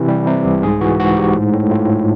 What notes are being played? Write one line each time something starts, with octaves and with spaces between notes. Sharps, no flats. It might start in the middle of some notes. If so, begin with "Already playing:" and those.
Already playing: C3 E3 B4
G3
C3
C2
G#2 G#4
E3 F#4
G#2 F#4
G#2 G4
A2
A2
A2 F4
A2